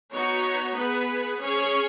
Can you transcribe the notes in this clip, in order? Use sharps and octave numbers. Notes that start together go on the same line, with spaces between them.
B3 D#4 F#4 C#5
B3 G#4 B4
C#4 G#4 C#5